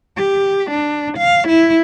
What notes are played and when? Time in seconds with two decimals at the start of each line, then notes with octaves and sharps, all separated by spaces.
0.18 G4
0.71 D4
1.18 F5
1.48 E4